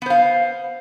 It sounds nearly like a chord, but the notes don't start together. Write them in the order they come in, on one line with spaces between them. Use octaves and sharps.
B3 C5 F5